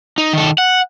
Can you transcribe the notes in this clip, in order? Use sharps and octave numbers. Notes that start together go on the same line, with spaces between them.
D#4
D#3 A4
F#5